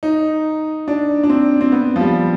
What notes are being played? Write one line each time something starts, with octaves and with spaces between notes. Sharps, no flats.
D#4
D4
D4
C4
C4
B3
F3
G3